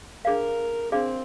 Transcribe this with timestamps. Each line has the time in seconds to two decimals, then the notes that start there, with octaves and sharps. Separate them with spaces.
0.25 D4 G#4 A#4 D5 F5
0.92 C4 D4 G#4 D5 F5